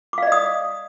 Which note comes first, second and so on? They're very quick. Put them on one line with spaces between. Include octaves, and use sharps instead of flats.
D6 F5 D5 D#5 D#6